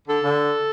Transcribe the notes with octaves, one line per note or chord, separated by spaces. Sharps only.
D3 A4
D3